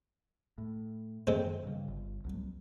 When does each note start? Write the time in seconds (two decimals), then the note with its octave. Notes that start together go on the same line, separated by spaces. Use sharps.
0.58 A2
1.27 F#2 D#3 E3 G#3 C4
1.63 G2 C#3
1.88 G1
2.24 C2 F#3